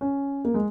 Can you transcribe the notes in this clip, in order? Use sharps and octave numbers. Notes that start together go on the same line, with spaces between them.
C#4
A#3
G#3